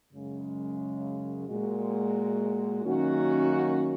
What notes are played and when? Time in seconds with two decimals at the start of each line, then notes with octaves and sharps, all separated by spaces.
0.12 F#2 C#3 G#3
1.48 A#2 G#3 F#4
2.84 F#2 D#3 A#3 C#4 F#4